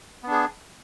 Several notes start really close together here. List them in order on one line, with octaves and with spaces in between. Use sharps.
B3 D4 G#4